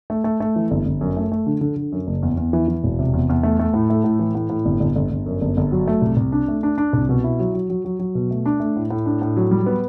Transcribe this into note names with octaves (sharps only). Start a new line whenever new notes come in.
A3
A3
A3
E3
G1
G1
F#2
A3
A3
D3
D3
D3
F#2
F#1
E2
E2
E3
E3
E1
C3
E2
E2
A3
A3
A2
A3
A2
E3
A2
A2
G1
G1
G1
G1
F#2
G1
G1
F#3
A3
C2
C2
D4
A3
D4
D4
C2
B2
E4
F#3
F#3
F#3
F#3
F#3
B2
A3
D4
A3
A2
A2
D4
A2
F#3
G3
B3